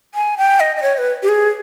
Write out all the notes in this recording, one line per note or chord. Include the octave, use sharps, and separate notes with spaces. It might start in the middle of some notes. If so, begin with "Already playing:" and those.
G#5
G5
D#5
D#5
C#5
B4
G4
G#4